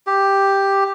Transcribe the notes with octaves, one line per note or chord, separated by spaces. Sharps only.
G4